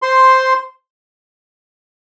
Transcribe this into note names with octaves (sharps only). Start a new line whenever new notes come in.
C5 C6